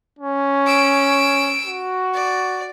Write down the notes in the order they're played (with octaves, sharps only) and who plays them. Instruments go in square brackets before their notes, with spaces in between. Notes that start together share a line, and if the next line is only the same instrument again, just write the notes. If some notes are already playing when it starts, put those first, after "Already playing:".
[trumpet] C#4
[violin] E6 D7
[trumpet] F#4
[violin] D5